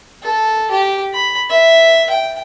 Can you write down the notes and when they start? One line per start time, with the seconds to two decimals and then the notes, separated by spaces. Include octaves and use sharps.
0.23 A4
0.71 G4
1.13 B5
1.50 E5
2.10 G5